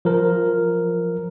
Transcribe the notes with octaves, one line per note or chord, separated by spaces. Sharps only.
F3 A#4